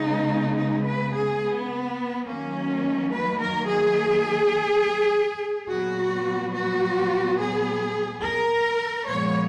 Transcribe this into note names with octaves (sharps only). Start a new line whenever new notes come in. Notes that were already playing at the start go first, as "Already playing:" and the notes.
Already playing: C#3 G#3 B3 D#4
D#4
B4
G#4
B3
D#3 F#3 A#3 C#4
B4
A#4
G#4
A#2 F#3 B3 F#4
F#4
G#4
A#4
A#2 F3 G#3 B3 C#5